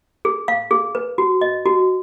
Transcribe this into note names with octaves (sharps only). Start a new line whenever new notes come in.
G#4
F5
G#4
B4
F#4
D#5
F#4